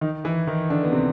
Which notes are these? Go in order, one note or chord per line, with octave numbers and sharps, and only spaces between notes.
D#3 D#4
E3 E4
D#3 D#4
D3 D4
B3
C3 C4